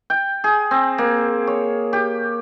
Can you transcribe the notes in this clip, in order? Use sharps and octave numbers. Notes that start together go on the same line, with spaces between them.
G5
G#4
C4
A#3
C#5
G4